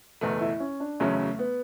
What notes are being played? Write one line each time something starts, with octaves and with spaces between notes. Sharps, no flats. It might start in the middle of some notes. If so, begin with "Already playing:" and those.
F#1 E2 B2 A3 B3
E4
C#4
D4
F#1 E2 C#3 F#3 A3 C#4
B3